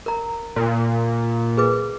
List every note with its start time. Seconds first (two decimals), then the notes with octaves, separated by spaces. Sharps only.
0.06 A#4 A#5
0.56 A#2
1.57 G#4 B4 D6